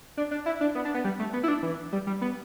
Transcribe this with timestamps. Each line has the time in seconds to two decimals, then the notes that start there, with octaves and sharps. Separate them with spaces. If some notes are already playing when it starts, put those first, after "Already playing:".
0.17 D4
0.31 D4
0.46 E4
0.61 D4
0.75 B3
0.85 D4
0.94 B3
1.04 G3
1.19 A3
1.33 B3
1.43 E4
1.48 D4
1.63 E3
1.92 G3
2.07 G3
2.21 B3